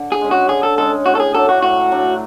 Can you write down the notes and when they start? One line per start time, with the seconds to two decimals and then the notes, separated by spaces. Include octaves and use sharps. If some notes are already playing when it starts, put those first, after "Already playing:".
Already playing: D3
0.12 G#4
0.21 G#3 C#4
0.31 F#4
0.49 D3 G#4
0.63 A4
0.78 G#3 C#4 A4
1.06 A2 F#4
1.15 A4
1.20 G#4
1.34 F#3 A3 D4 A4
1.49 F#4
1.63 A2 F#4
1.92 F#3 A3 D4